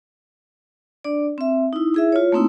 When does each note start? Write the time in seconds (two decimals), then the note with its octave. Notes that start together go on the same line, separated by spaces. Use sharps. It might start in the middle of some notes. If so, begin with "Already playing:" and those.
1.04 D4 D5
1.38 C4 E5
1.73 D#4 E4
1.94 E4 G#4 E5
2.12 F4 C#5
2.32 A3 A#3 C4 D#4 E4